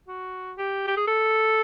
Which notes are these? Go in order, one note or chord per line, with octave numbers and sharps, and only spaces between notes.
F#4
G4
G4
G#4
A4